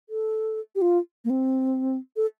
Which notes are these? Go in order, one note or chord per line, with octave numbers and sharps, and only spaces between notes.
A4
G4
F4
A#3
C4
A4